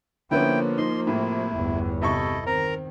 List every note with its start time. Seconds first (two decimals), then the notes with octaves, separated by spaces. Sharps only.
0.31 D3 F3 A#3 B3 C#4 E4 G5
0.78 D#4 C6
1.07 A2 C3 E4
1.53 G1 E2
2.02 C3 E4 A4 D#5 E5 C#6
2.46 D#3 C4 A#4 A#5